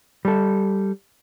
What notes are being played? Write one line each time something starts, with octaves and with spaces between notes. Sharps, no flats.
G3 A4